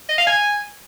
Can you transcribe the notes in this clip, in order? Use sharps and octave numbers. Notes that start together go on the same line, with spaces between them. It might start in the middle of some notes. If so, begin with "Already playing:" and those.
D#5
F5
G#5